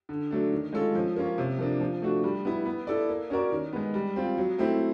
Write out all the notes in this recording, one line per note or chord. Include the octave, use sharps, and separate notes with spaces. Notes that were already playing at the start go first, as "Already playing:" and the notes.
D3
F#3 A3 D4
D#3
G#3 C#4 F4 A4
F3
A#3 C#4 F4
C3
F3 A#3 D4
F3
A3 D4 F#4
G3
B3 E4
B3
E4 A4 D5
A#3
C#4 F#4 A#4 D5
D#3
G#3 B3
G3
C4 F4
F#3
A3 C4 E4